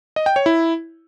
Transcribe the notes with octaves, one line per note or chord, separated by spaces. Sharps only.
D#5
G5
C#5
E4